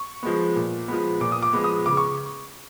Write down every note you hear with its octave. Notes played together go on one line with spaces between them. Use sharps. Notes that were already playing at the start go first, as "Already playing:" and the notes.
Already playing: C#6
F3 G#3 B3
A#2
F3 G#3 B3
A#2 D6
D#6
D6
F3 G#3 B3
D#6
C#3 D6
C#6